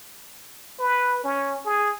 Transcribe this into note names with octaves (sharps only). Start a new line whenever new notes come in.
B4
C#4
G#4